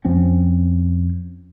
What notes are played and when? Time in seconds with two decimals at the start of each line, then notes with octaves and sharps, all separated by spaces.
0.05 F2 F3 C4 C#4